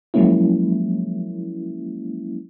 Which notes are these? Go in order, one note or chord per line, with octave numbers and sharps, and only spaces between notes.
F3 F#3 G#3 A#3 C#4 E4